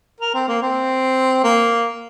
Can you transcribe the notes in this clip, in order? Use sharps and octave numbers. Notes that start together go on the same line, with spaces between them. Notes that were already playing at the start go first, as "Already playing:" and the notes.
A#4
C4
A#3
C4
A#3